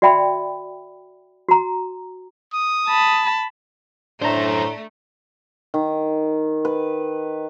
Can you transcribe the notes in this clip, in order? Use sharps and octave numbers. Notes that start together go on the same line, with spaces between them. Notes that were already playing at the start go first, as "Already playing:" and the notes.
F#4 D5 E5 G5 B5
F#4 A#5
D#6
A5 B5
F#2 A2 A3 D4 C5 A#5
D#3
B4